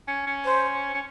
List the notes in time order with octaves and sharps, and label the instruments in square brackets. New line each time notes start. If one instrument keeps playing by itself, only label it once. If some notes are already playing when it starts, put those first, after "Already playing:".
[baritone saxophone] C#4
C#4
[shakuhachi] C5
[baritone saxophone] C#4